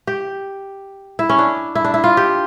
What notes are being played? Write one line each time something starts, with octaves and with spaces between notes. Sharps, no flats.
G4
E4
C#4
D4
E4
D4
E4
F4
G4